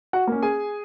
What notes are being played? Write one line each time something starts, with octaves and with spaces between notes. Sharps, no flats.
F#4 F#5
A#3 C#4
G#4 G#5